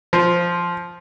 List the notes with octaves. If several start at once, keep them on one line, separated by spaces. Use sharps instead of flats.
F3